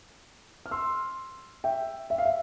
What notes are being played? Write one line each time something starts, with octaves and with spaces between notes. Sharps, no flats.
F6
C6 E6
E5 G5
E5
F5
E5